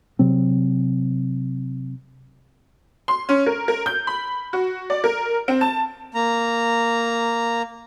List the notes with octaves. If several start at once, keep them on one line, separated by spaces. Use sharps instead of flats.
C3 F#3 C4
C6
C#4
A#4
A#4
G6
B5
F#4
D5
A#4
C4
A5
A#3 A#5